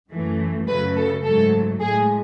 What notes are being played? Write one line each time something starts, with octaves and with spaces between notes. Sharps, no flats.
F#2 E3 A3
F#2 C#3 F#3 A3 B4
A4
G#2 F#3 A3 A4
A2 G#3 G#4